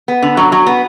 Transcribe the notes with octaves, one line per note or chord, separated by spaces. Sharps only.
B3
D3
F#3
F#3
B3